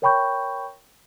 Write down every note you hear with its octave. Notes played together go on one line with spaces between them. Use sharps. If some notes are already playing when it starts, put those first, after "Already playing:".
A#4 C#5 G5 B5 C#6 G6